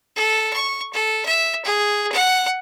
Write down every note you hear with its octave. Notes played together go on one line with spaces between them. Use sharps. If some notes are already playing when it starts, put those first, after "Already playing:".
A4
C#6
A4
E5
G#4
F#5